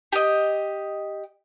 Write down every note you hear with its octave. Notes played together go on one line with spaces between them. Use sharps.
G4 D#5